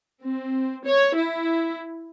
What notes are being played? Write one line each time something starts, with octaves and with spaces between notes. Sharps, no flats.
C4
C#5
E4